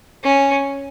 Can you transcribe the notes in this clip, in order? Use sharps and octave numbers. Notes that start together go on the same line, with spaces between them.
C#4